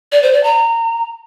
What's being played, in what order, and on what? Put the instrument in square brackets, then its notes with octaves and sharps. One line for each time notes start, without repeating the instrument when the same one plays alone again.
[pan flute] D5
C5
D5
A#5